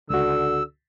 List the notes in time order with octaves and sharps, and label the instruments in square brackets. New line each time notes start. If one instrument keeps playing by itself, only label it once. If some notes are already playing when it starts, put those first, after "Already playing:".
[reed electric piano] C#2 F#4 [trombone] D3 [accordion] E6